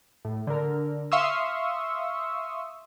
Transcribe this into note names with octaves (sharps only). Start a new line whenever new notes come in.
A2
D3 A#4
E5 F5 C6 C#6 D#6 E6